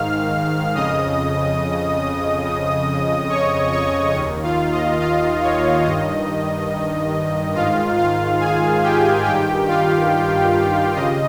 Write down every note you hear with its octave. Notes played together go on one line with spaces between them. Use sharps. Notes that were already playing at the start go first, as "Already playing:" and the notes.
Already playing: G#2 D#3 F5 F6
F2 C#3 D#5 D#6
F2 C#3
C#5 C#6
C#5 C#6
D#2 D#3
F4 F5
D#5
F4 F5
C#5
G2 D#3 D#5
G#2 D#3 F4 F5
F4 F5
G#4 G#5
G4 G5
G2 D#3 G4 G5
F4 F5
C#3 D#5